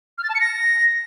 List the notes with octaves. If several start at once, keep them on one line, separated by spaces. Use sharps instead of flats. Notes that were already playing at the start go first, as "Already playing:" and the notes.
F6
A6
A5
C#7
A#6